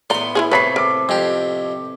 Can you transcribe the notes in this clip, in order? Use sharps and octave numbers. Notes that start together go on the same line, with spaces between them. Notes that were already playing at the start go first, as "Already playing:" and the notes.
A2 B3 D5 A#5 C6
E4 F4 G#4
C3 A3 B4 C#5 A#5 B5 B6 C7
A4 A#4 D6
F2 G4 F5